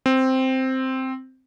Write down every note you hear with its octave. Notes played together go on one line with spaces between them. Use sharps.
C4